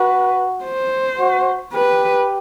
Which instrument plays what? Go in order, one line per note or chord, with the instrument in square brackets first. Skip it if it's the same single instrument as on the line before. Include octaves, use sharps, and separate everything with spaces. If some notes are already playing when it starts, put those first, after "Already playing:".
Already playing: [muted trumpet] F#4 [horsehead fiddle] B4
[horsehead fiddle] C5
[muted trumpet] F#4
[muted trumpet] G4 [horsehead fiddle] B4